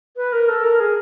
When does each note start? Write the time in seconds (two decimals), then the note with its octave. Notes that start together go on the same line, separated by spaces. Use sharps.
0.16 B4
0.32 A#4
0.49 A4
0.64 A#4
0.80 G#4